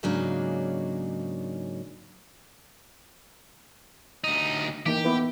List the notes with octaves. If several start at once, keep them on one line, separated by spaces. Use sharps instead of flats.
G#2 C#3 F#3 A#3 D4 D#4
D2 D#4
E3 A#3 D#4 G4
B3 E4 B4